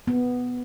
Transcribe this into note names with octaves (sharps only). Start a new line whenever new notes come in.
B3